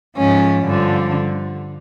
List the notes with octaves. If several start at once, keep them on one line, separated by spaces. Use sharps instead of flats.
G#2 F3 C#4
G2 D3 F3